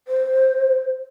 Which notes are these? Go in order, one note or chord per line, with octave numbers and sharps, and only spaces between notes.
C5